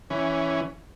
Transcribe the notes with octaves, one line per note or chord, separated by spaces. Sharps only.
E3 C#4